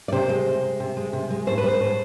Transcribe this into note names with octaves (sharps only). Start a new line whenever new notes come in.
D5
C3 C5
G#3
C3
G#3
C3
G#3
C3
G#3
A2 C5
B4
G#3 C5
A2